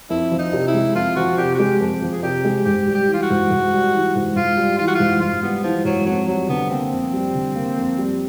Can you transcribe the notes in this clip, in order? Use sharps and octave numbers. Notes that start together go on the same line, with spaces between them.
F2 E4
F3
D#4
C3
E4
G#3
F2 F4
F3 F#4
C3 G4
F#4
G#3 G4
F2
F3
G#4
C3 G4
G#3
G#2 G4
G3
G4
E3
F4
F#4
G#2
G#2
G3
E3
G#2
G#2 F4
G3
E3 F4
F#4
F4
G#2
G#2 F4
G3 B3
E3 F3
G#2 F#3
F2 F#3
F#3 G3
D3 B3
A#3 C4
F2
G3
D3
A#3
F2
G3